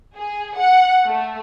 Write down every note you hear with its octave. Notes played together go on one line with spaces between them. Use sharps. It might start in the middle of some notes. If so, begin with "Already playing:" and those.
G#4
F#5
A3